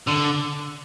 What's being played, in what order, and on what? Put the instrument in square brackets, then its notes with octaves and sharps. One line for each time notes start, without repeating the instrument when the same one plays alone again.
[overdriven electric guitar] D3